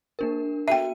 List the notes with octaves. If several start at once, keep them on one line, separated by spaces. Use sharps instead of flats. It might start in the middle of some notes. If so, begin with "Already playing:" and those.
A#3 D4 A#4
B3 F#4 E5 G5 D#7